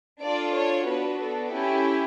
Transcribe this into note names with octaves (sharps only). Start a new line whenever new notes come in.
D4 F4 A4 D5
C#5
B3 D4 F#4 B4
A4
C#4 E4 G4